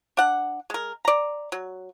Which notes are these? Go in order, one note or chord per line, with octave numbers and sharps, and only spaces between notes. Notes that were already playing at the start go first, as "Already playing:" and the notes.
D4 F#5
G#3 A#4
D5 A#5
F#3